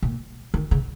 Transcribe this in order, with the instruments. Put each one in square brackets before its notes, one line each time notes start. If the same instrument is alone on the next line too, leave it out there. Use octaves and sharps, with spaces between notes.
[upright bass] A#2
D#3
C#3